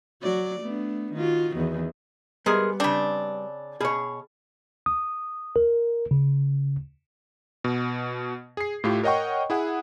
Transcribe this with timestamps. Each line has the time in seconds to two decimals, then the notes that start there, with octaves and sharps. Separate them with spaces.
0.22 F#3 F#4 D5
0.60 A3 B3 D4
1.13 D#3 F4 F#4
1.54 E2 D#3
2.46 G3 G#3 B3 G#4 A#4
2.80 C#3 C4 D4
3.81 B2 G#4 C#5
4.86 D#6
5.56 A#4
6.11 C#3
7.64 B2
8.57 G#4 C7
8.84 A2 A3 F4 G4
9.03 A#4 C#5 D#5 F#5 G5 C#6
9.50 E4 G#4 F#5